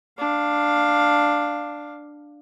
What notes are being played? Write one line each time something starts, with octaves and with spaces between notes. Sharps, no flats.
D4 F5